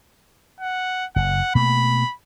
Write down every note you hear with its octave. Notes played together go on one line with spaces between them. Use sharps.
F#5
F#1 F#5
B2 A3 A#3 B5